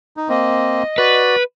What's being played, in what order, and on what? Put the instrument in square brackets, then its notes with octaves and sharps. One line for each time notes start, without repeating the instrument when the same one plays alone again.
[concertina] D#4
[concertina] A#3 C4 [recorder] D#5
[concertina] F#4 D5 [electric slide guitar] B4